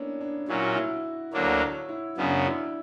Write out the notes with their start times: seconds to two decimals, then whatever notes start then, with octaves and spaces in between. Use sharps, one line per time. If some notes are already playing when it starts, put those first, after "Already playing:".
Already playing: A#3 B3 C#4 D4 E4
0.21 D4
0.48 A#2 F#3 C#4 E4
0.61 F#4
0.74 E4
1.33 D2 D3 F#3 A#3 D4 C#5
1.61 C#5
1.89 E4
2.17 F#2 C#3 F#3 B3 D4
2.46 E4